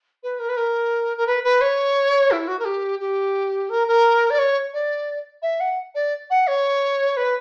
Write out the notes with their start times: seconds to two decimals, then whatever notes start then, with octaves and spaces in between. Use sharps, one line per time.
0.23 B4
0.39 A#4
0.49 B4
0.57 A#4
1.17 A#4
1.27 B4
1.43 B4
1.61 C#5
2.31 E4
2.47 F#4
2.59 A#4
2.65 G4
2.99 G4
3.69 A#4
3.87 A#4
4.30 D5
4.38 C#5
4.73 D5
5.42 E5
5.60 F#5
5.95 D5
6.30 F#5
6.47 C#5
7.17 B4